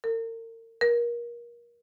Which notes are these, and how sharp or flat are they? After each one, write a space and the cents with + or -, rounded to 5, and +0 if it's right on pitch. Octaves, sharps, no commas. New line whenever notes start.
A#4 -40
A#4 +30